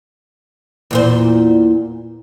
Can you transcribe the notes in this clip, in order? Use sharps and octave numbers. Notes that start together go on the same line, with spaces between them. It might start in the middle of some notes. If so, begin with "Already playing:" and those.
E2 A#2 C5